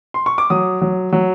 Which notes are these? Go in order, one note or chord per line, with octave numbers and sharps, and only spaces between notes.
C6
C#6
D6
F#3 D#6
F#3
F#3